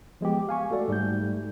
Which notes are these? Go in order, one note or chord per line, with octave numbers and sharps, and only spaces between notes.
F3 G#3 B3 G4
F5 G#5 C#6
A3 F#4 A4 D5
G#2 G3 A3 G6